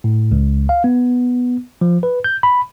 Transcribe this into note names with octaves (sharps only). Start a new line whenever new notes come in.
A2
C#2
F5
B3
F3
B4
G6
B5